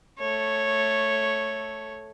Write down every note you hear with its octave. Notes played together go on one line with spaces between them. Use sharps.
A3 C#5